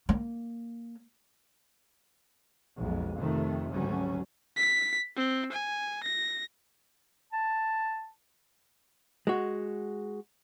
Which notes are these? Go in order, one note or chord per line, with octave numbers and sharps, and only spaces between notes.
A#3
B1 F2 G#3
F2 C3 D#3 A3
G#1 D2 F#3 G3 C#4
B6
C4
G#5
A#6
A5
G#3 F#4